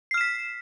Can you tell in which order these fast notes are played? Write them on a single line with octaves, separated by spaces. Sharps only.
C7 F6 E7 B6